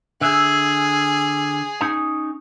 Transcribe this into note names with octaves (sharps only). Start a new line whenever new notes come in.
D3 G#4 E5
C#4 D#4 G#5